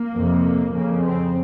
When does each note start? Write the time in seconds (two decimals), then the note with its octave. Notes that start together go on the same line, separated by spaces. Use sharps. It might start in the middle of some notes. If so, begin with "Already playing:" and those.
Already playing: A#3
0.13 F2 C3
0.73 F2 C#3 A#3
1.02 C4